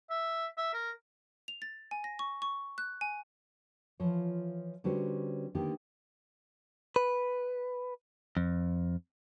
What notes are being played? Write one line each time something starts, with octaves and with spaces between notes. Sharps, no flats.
E5
E5
A#4
F7
A6
G#5
A#6
C#6
C#6
F#6
G#5
E3 F3 F4 C#5
D3 G3 C#4 F#4 B4 C5
D3 D#3 A#3 B3 D4 G4
B4
F2